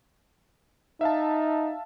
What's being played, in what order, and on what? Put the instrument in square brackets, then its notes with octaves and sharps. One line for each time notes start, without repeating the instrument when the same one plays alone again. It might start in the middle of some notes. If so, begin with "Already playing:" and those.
[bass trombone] D#4 [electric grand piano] E5 F5 A5